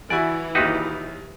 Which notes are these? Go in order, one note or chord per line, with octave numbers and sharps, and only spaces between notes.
E3 E4 F#4 D5 G#5
A#1 D#2 D#4 F#4 G4 B4